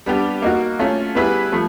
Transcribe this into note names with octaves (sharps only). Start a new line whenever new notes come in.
G3 B3 D4 G4
A#3 D#4 F#4
A3 C#4 F4
G3 B3 E4 G#4 B4
F3 A3